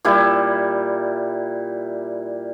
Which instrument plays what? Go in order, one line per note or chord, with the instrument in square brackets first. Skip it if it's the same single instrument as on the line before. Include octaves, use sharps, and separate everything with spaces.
[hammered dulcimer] A#2 G3 E4